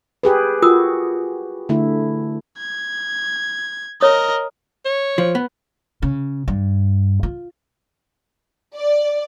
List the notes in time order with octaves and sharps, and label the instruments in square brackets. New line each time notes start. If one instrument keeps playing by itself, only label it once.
[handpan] G4 G#4 B4
[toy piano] F4 A#4 D#6 [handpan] F#4
[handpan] D3 A3 E4
[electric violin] G#6
[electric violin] A#4 D#5 [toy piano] C#5 D#6
[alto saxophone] C#5
[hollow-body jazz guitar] F3
B3
[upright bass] C#3
G2
F4
[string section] D5